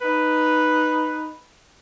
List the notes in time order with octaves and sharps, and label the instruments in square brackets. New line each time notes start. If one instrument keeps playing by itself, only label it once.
[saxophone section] D#4 B4